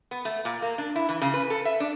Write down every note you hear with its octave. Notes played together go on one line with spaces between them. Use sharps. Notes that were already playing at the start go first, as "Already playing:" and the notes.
B3
A3
A#2
A#3
D4
E4
E3
C#3
B4
A4
E5
D4